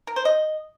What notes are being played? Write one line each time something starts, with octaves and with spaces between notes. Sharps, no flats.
A#4
C5
D#5